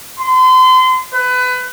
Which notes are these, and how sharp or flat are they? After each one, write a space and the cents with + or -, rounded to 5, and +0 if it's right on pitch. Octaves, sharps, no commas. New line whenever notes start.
C6 -35
B4 +25